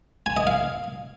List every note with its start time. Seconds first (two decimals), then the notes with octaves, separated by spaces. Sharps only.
0.26 G#5
0.37 D#5
0.47 F5